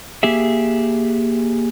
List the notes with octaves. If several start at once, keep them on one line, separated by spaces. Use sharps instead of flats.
A#3 G4 G#4 E5